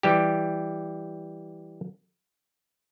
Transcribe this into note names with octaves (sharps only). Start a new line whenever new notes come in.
E3 G3 G4